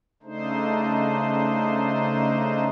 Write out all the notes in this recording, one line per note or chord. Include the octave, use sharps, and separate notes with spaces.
C#3 A3 D4 D#4 C5